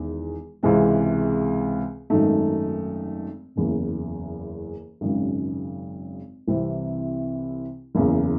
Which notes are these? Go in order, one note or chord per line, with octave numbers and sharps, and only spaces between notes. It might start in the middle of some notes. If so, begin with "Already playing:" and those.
Already playing: E1 E2 D#3
C#2 C3 E3 G#3 C4
G#1 F#2 D#3 A3 D#4
F#1 E2 C#3
G#1 F#2 C#3
C2 C3 E3 C4 E4
F#1 E2 C#3